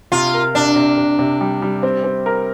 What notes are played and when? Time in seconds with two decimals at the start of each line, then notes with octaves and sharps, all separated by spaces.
0.12 C3 F4
0.34 A#4
0.55 C3 D4
0.76 C3
0.97 C3
1.19 C3
1.41 G3
1.62 G3
1.83 C4
2.04 C4
2.26 A#4